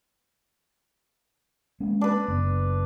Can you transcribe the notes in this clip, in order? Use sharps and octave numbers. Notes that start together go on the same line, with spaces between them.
G#3 A#3 C#4
D4 B4
F#1 B3